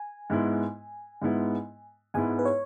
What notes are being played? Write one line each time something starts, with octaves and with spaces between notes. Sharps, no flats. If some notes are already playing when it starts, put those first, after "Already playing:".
Already playing: G#5
G#2 G#3 B3 E4
G#2 G#3 B3 E4
G#2 G#3 B3 E4 G#5
B4
C#5